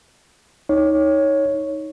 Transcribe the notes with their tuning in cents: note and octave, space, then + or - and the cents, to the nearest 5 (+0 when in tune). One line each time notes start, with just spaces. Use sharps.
D#4 +15 C#5 +0